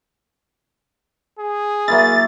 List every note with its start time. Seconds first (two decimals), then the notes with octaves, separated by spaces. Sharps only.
1.39 G#4
1.88 F#3 A#3 E4 A6